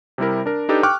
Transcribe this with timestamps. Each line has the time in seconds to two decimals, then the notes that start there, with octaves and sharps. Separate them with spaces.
0.18 C3 G3 E4 A#4
0.46 D4 A#4
0.69 D4 D#4 G4 A4 B4
0.83 G5 C#6 D6 F6 F#6